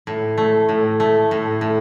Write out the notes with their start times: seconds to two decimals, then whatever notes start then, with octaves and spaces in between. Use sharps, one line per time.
0.07 A2
0.38 A3
0.69 A2
1.00 A3
1.31 A2
1.61 A2